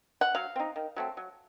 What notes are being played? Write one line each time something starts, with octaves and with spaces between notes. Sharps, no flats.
F#5
F#3 F5
C4 D#4
D#3
F#3 A3 C4
F#3